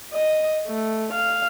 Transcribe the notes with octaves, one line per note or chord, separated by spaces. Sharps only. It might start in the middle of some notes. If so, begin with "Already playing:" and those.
D#5
A3
F5